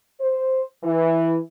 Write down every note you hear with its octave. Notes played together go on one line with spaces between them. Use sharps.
C5
E3